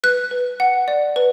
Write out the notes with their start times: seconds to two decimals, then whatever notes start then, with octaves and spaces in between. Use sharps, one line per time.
0.03 B4 F#6
0.31 B4
0.60 F#5
0.88 D5
1.16 B4